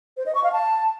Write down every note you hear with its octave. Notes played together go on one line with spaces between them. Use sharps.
C5
D#5
C#6
F5
A5